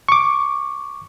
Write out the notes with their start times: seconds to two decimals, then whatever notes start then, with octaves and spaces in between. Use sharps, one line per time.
0.09 C#6 D6